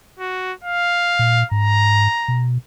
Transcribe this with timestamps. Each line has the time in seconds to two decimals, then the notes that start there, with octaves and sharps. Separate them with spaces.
0.19 F#4
0.64 F5
1.19 A#2
1.51 G#2 A#5
2.28 B2